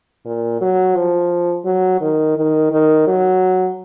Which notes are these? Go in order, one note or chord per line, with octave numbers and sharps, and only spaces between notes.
A#2
F#3
F3
F#3
D#3
D#3
D#3
F#3